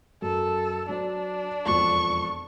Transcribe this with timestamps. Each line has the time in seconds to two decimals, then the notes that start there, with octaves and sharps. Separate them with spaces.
0.22 F#2 A4
0.89 F#3 D4 C5
1.66 E1 F2 C#6